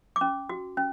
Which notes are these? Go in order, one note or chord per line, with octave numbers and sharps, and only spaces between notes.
D6
C#4
F#4
C#4